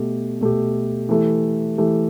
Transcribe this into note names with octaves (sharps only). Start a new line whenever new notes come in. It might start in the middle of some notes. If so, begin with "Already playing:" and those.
Already playing: B2 A3 G4
B2 A3 G4
E3 A3 G4
E3 A3 G4